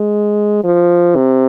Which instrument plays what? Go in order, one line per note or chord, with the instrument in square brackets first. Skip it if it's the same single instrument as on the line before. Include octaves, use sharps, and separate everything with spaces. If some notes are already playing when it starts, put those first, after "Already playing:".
Already playing: [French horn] G#3
F3
C3